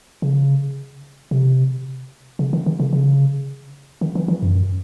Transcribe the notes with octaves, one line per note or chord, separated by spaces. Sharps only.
C#3
C3
C#3
D#3
D#3
C#3
C#3
D#3
E3
E3
F#2